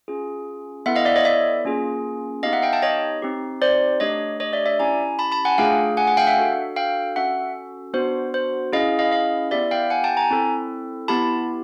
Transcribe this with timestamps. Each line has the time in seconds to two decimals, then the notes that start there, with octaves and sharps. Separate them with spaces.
0.08 C#4 F4 G#4
0.86 B3 E4 A4 E5 F#5
0.96 D#5 F5
1.05 D5 E5
1.16 C#5 D#5
1.25 D5 E5
1.65 A#3 C#4 F4 G#4
2.43 B3 D#4 G4 D#5 F5
2.53 E5 F#5
2.62 F5 G5
2.73 G5 A5
2.82 C#5 D#5
3.22 C4 D#4 G4
3.62 C5 D5
4.00 A3 D4 G4 C#5 D#5
4.40 C#5 D#5
4.53 D5 E5
4.66 D5 E5
4.79 C#4 E4 G4 G#5 A#5
5.19 A5 B5
5.32 A5 B5
5.45 F#5 G#5
5.58 A3 D4 F4 G#4 F5 G5
5.97 F#5 G#5
6.07 F#5 G#5
6.17 F5 G5
6.27 E5 F#5
6.36 D4 F#4 A4
6.76 F5 G5
7.16 C#4 F#4 A4 E5 F#5
7.94 B3 D4 F#4 C5
8.34 C5
8.73 C#4 E4 G#4 D#5 F5
8.99 D#5 F5
9.12 D#5 F5
9.51 B3 E4 G4 D5 E5
9.71 F5 G5
9.90 F#5 G#5
10.04 G5 A5
10.17 G#5 A#5
10.30 C4 E4 A4
11.08 B3 E4 G4 A5 B5